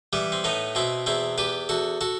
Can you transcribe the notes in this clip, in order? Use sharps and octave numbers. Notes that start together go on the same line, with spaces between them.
E3 G3 B3
C4
A2 B3 D#4
B2 C4 E4
E2 C4 E4
E2 G4 B4
E2 F#4 A4
F#4 A4